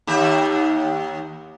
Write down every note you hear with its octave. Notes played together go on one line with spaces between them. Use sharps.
D#2 G4 E5